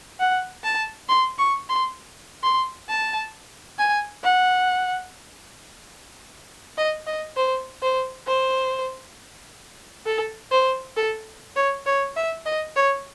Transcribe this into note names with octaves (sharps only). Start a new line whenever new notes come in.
F#5
A5
C6
C#6
C6
C6
A5
G#5
F#5
D#5
D#5
C5
C5
C5
A4
C5
A4
C#5
C#5
E5
D#5
C#5